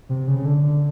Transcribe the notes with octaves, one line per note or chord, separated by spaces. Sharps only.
C3
C#3
C#3
D3
D3